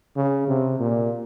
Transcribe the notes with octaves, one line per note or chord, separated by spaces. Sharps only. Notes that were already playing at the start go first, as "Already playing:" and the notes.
C#3
C3
A#2